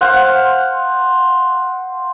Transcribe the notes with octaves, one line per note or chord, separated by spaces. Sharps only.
C5 F5 F#5